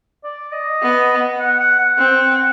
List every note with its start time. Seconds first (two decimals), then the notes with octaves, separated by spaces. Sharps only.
0.24 D5
0.52 D#5
0.82 B3
1.40 F#5
1.60 F#5
1.79 F#5
1.98 C4